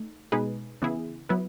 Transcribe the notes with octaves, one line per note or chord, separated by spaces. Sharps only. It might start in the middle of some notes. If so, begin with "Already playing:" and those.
Already playing: A3 D#4
B2 G#3 D#4 G#4 B4
C#3 E3 B3 E4 G#4
F#3 B3 E4 B4